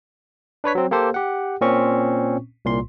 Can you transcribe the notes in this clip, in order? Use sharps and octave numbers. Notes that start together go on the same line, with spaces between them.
D4 B4 C#5 B6
F#3 C4
A#3 G4 A4 C5
G4 F#5
A#2 C4 C#4 C#6
C2 A#2 C6